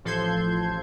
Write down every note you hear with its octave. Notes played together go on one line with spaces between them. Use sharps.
A1 F3 A4 C6 G6 G#6